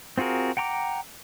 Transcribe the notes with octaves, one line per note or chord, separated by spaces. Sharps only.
C4 F4 F#4 G#4 A#4
F#5 G5 A#5 C#6 D6